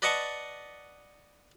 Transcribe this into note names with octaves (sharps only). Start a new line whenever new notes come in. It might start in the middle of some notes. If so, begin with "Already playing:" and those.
B4 D5 D#5 F#5 A5 C#6